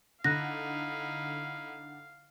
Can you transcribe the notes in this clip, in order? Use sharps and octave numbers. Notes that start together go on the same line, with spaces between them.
D3 D#4 E4 F5 F#6 A#6